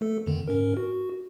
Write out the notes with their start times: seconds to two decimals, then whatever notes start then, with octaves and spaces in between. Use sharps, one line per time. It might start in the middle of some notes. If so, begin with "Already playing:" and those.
0.01 A3 A4
0.26 F2 D3 D#3
0.48 G#2 C#4 A#4
0.77 F#4